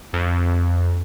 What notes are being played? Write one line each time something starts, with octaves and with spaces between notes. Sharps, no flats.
F2